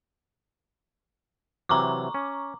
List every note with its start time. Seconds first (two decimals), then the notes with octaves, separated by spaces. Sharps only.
1.69 C3 E3 F#3 A#5 C#6 D6
2.14 C#4